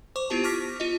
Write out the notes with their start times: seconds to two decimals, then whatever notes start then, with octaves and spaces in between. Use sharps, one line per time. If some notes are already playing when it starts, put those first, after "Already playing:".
0.16 C5 C#6 D6
0.30 B3 E4 F4 G4 A5
0.44 A5 C#6 D6 F6 A#6 B6
0.80 F4 D#5